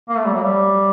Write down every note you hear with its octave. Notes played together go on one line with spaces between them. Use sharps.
A#3
A3
G3
F#3
G3